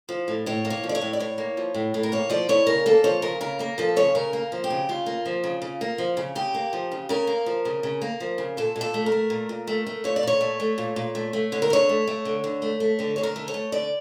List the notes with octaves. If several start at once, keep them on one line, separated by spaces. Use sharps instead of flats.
F3
A2
A2 C#5
A#3
C#5
F3
D5
C#5
A2
D5
A2 C#5
A#3
F3
A2
A2
A#4
A#3 C#5
F3 D5
A2 C#5
C#3 A#4
A#3 A4
F3 C#5
C#3 A#4
C#3 A#4
A#3 A#4
F3 A4
C#3 C#5
C#3 A#4
A#3
F3
G4
C#3
C#3 F4
A#3
F3
C#3
C#3
A#3
F3
C#3
C#3 G4
A#3
F3
C#3
C#3 A#4
A#3
F3
C#3
C#3
A#3
F3
C#3
A#2 A4
A#2
A4
A3
A#4
A3
A#2
A#2
A3
A3
A#2 C#5
D5
A#2 C#5
A3
A3
A#2
A#2
A3
A3
D3 C#5
A#4
D3 C#5
A3
A3
D3
D3
A3
A3
D3 C#5
D3 C#5
A#4
A3
C#5
A3
D3 D5